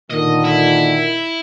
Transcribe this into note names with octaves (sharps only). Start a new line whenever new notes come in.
A#2 D3 D#3 D#5
E4